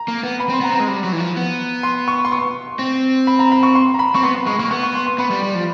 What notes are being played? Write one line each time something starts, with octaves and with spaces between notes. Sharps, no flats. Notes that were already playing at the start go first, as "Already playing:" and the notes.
Already playing: A#5
A#3
B3
B5
C4 C6
B3 A#5
C4
G#3 A#5
G3
F#3
E3
F3
B3
C6
C#6
C6
C#6
C4
B5
A#5
B5
C#6
C6
A#5
B5
C4 C#6
B3 C6
B5
G#3 C#6
A#3 C#6
B3 C#6
C#6
C6
C6
B3 B5
G3
G3
F3